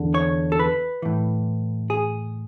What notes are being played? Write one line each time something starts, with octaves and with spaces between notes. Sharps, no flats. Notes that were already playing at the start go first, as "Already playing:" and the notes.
Already playing: E2 D3
C#5
A4
B4
A2 E3
G#4